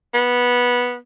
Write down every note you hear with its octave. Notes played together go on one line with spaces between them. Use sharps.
B3